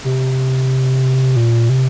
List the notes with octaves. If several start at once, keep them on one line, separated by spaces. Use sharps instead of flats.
C3
A#2
C3